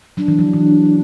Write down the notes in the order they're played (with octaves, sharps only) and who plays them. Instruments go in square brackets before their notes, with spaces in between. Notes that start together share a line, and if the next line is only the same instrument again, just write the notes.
[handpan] F#3 [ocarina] D4
[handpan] E3
F#3
E3